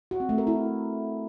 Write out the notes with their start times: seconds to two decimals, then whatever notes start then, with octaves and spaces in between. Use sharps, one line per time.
0.11 F#4
0.20 C4
0.29 A3
0.38 A#4
0.47 E4